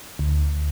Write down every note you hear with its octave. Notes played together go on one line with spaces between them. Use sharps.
D2